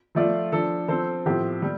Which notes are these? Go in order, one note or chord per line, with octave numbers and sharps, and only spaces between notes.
F3 A3 F4 D5 F5
F3 D4 A4
F3 C4 A4 C5
A2 F3 C4 G4
G3